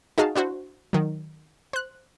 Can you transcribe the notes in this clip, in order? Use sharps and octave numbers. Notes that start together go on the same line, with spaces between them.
D#4 F#4 G#4 D#5 F5 A5
D4 E4 F#4 C5
D#3 F#3
C5 F#6